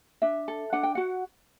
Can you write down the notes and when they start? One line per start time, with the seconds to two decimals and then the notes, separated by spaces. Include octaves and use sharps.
0.22 D4 E5
0.48 A4
0.73 D4 F#5
0.83 G5
0.95 F#4 F#5